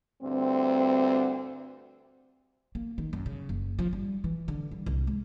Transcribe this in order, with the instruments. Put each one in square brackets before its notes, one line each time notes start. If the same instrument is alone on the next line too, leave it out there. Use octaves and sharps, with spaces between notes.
[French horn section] D2 G2 C4
[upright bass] A#3
D#3
F#2
C#3
F#1
F3
G3
E3
D3
G3
C2
G#3